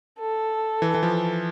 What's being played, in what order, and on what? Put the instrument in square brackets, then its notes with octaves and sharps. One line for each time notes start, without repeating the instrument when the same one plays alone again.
[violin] A4
[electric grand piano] E3
E3
F3